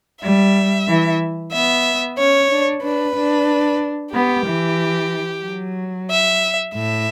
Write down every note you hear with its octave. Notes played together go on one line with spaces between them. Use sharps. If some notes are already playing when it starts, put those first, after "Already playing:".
G3 E5
E3
B3 E5
C#4 C#5
D4
D4 B4
D4
B3 G4
E3
F#3
E5
A2 E5